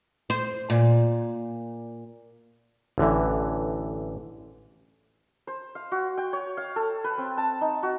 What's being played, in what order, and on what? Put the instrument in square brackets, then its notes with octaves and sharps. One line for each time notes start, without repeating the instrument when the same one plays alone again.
[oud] C5
A#2
[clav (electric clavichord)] A1 D3 E3
[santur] C5
F5
F#4
G5
C#5
F5
A4
B4
C4
A5
D#4
F#4